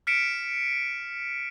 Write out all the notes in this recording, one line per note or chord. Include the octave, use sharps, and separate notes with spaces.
F6 B6 C#7 D7 E7